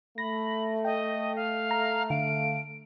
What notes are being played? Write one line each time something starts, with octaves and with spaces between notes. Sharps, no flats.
A3 B5 A#6
D#5 G5
F5
A#5 F6
D3 F5 D7